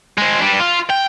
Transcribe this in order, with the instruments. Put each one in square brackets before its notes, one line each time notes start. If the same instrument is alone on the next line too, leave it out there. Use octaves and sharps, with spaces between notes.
[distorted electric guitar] G#3 C4
G3 D4
F4
G5